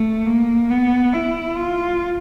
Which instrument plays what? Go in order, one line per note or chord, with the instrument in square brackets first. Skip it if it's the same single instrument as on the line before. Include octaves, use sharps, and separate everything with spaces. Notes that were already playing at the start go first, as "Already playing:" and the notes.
Already playing: [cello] A3
A#3
B3
E4
F4